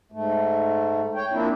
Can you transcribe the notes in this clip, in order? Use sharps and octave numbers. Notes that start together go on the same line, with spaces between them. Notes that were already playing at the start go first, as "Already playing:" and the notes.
G#2 A3
C#5 G5
F3 A#3 C4 D4 E4